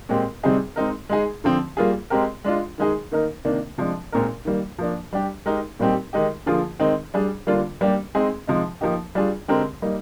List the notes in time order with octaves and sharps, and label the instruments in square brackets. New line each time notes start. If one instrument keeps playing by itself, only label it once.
[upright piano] A#2 G#3 C4 G4
C3 G3 C4 D#4 G#4
G#3 C4 D#4 A#4
G#3 D#4 G#4
D3 F3 C4
G3 A#3 F4 G#4
G#3 C4 G4 A#4
G#3 D4 F4
D#3 G#3 D#4 G#4
D#3 A#3 D#4 A#4
C3 D#3 A#3 D4
C3 F3 G#3 D4
A#2 G#3 C4 D#4 A#4
D#3 G3 A#3
F3 A#3 D4
G3 D4 G4
G#3 D#4 G4 A#4
A#2 G3 C4 D#4 G4
D#3 G#3 D#4 G4
D3 F3 A#3 F4 G#4
D#3 G#3 C4 D#4
G3 D4 G#4
D3 G3 A#3 D4 F4
G3 A#3 D4 G4
G#3 C4 D#4 G#4
C3 F3 G#3 D#4
F3 A#3 D#4 G4
G3 D4 F4 G#4
D3 G#3 C4 G4 A#4
G3 A#3 D#4